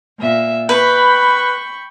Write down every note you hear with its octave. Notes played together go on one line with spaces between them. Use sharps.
A#2 E5
B4 G5 B5 C#6